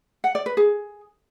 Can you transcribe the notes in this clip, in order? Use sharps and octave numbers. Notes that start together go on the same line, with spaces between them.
F#5
D5
B4
G#4